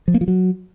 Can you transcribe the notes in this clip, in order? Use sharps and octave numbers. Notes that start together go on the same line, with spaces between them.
F3
A#3
F3
F#3